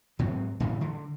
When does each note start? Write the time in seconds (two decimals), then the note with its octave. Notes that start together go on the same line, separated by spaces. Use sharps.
0.19 G#2 F#3 C4
0.60 A2 C#3 E3
0.81 D3